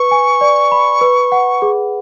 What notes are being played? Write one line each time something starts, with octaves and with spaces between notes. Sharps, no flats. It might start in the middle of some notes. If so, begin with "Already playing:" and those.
Already playing: B4 C#6
G#5
D5
B5
B4
F#5
G#4